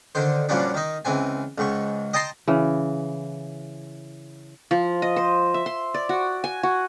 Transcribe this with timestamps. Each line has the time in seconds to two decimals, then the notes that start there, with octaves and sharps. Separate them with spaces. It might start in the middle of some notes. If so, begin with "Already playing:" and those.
0.15 D3 D#3 C5
0.49 F#2 A#2 F3 G3 C#4 D4
0.74 D#3 D#4
1.05 C#2 E3 C4 G#5
1.58 C#2 G#2 C#6
2.13 D#5 G5 A5 A#5 C6
2.48 C#3 E3
4.71 F3
5.02 D#5
5.16 C5
5.54 E5
5.66 C6
5.94 D5
6.09 F#4
6.44 G#5
6.63 F#4